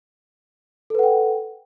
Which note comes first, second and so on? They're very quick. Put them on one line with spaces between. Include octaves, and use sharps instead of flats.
A4 B4 F#5 G5